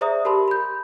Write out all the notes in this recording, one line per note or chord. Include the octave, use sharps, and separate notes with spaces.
G#4 C5 D5 E5 A#5 D#6
G4 A#4 A5 B5 C6
B5 G6